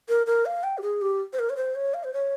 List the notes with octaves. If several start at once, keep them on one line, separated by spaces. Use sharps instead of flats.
A#4
A#4
F5
G5
G4
G#4
G4
C5
A#4
C#5
C5
C#5
F5
C5
C#5